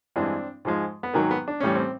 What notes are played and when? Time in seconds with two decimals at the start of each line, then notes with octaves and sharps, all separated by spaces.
0.16 G2 E3 G#3 C4 D4
0.65 G#2 F3 G#3
1.03 B3
1.14 G#2 D#3 F#3 A#3
1.31 B3
1.48 D4
1.60 A2 E3 G3 C#4
1.75 C4